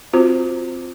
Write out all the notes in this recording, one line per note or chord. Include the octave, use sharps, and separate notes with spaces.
C4 F4 F#4 C5